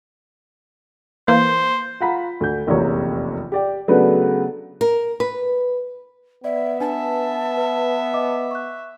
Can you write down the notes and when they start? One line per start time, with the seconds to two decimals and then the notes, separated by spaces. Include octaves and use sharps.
1.28 E3 A#3 C5
2.00 F4 F#5 A#5 B5 B6
2.40 D2 G6
2.67 F1 A#1 E2 C3 A#3 C#5
3.52 G4 D5 G5
3.88 C#3 F#3 A3 B3 D4 B4
4.81 A#4
5.20 B4
6.44 B3 D5 E5
6.80 D4 B4 E5 G#5 A5
7.57 B4
8.14 D#5 D6
8.51 C#6 F#6